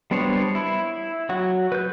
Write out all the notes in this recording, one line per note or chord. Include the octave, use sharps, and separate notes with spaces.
G3 B3 D4 C5 C#5
E4
F#3 F#4
B4 G6